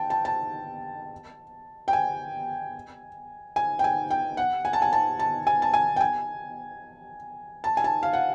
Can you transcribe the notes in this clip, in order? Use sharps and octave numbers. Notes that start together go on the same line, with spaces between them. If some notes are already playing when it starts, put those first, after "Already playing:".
Already playing: G5 A5
A5
A5
G5
G#5
G#5
G5
G#5
G5
F#5
G#5
A5
G#5
A5
A5
G#5
A5
G#5
G5
G#5
A5
G#5
A5
F5
F#5